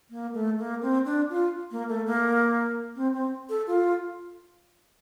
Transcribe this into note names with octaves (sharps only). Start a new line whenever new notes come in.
A#3
A3
A#3
C4
D4
F4
A#3
A3
A#3
C4
C4
A4
F4